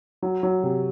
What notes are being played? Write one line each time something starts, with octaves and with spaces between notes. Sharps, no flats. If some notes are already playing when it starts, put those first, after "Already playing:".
F#3
F#3
C3